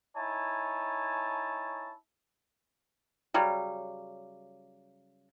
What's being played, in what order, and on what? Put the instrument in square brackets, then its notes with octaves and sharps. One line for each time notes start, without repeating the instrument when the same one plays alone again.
[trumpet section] D#4 E4 C#5 G#5 A5
[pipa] C#3 F#3 G3